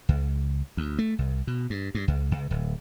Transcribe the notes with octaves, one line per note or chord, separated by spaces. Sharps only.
C#2
D2
A3
C2
B2
G2
G2
C#2
C#2
D1